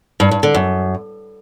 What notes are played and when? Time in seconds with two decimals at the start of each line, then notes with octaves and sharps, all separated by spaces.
0.20 G2
0.31 G2
0.43 D3
0.54 F#2